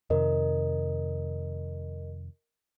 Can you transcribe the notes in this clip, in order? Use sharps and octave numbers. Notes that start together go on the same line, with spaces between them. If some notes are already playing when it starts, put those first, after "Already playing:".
F2 C3 D#3 A#4 D#5